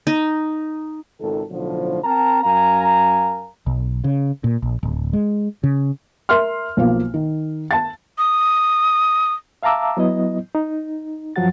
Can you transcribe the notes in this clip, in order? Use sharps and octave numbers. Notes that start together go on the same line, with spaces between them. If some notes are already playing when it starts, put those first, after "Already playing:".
D#4
G#1 C#2 D#3 A4
B1 A2 D3 F3
C4 A#4 G5 A5 A#5
F#2 A#4 F5 G#5 A#5
B1
C#3
A#2
A#1
D1
G#3
C#3
A#4 E5 C6 F6
B1 F3 A#3
D#3
A5 A6
D#6
E5 F5 A5 A#5 D6 E6
F#3 B3 E4 D#5
D#4
F#2 F3 F#3 F#4 F#5 A6